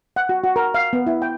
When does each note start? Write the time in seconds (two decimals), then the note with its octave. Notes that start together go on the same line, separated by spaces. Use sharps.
0.16 F#5
0.29 F#4
0.44 F#4
0.56 A#4
0.74 F5
0.93 B3
1.07 E4
1.22 G5